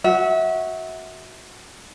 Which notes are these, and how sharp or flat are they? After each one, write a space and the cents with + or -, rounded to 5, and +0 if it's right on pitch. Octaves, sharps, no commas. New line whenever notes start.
F#4 -5 E5 -30